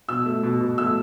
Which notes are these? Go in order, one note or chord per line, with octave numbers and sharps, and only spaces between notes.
B2 E6
A3
B2
B2
A3 E6